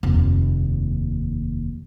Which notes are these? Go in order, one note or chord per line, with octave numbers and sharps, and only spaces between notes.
F1 D#2